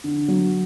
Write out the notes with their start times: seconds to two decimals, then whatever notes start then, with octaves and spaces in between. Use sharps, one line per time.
0.04 D3
0.28 F#3